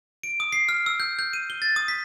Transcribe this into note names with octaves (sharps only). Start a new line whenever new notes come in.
D7
D#6
C7
F6
E6
G6
G6
D#7
G7
A6
D#6
B6